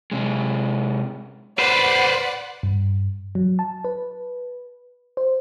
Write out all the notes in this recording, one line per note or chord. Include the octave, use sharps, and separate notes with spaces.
C3 G#3
B4 C5 D5 F#5 B5
G2
F#3
A5
B4
C5